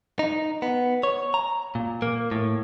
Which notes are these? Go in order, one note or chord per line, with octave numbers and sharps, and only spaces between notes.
D#4
B3
C#5
A#5
A#2
A#3
A2